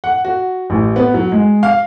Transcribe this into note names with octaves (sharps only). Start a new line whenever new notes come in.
F#5
F#4
A1
B3
F#3
G#3
F5